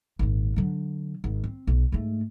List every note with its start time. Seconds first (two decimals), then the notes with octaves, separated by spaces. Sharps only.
0.19 G#1 A#2
0.56 D3 F#3
1.24 G#1
1.44 C4
1.67 B1
1.92 G#2 A3